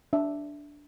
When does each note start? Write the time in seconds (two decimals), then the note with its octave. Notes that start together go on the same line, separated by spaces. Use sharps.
0.13 D4 E5